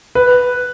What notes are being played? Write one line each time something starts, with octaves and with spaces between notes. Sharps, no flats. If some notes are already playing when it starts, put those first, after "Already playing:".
B4